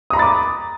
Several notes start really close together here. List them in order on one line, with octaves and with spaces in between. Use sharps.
D#6 A#5 B5 A6 D6